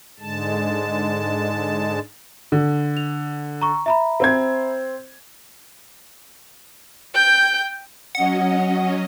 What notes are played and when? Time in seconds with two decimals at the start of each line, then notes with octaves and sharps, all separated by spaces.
0.20 G#2 D3 G#3 A5
2.52 D3
2.97 F7
3.61 A#5 C#6
3.86 E5 A#5 B5
4.20 C4 C5 G#6
7.14 G5 G6
8.15 F#3 C#4 D#5 F#5